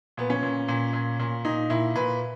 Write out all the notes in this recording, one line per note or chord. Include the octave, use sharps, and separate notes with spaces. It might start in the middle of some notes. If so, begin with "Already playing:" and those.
A#2 B3
C#4
A#2
A#2
A#2
A#2
A#2 D#4
A#2 E4
A#2 B4